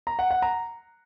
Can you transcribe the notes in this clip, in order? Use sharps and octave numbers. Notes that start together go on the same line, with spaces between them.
A#5
F#5
F#5
A#5